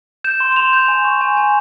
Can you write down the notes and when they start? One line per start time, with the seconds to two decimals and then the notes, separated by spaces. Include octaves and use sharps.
0.24 G6 E7
0.40 C6
0.52 E7
0.56 C6 F7
0.73 G6
0.88 G#5
1.05 C#6
1.21 G#5
1.37 G#5